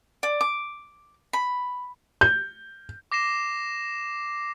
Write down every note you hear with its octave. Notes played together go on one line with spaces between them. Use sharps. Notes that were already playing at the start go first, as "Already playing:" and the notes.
D5
D6
B5
G6
D6 A#6 C7 E7